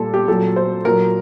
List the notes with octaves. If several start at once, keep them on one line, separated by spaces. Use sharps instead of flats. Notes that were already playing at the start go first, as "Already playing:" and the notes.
Already playing: A#2 G3 A4
G4
A#2 F#3 A4
C5
A#2 F#3 A#4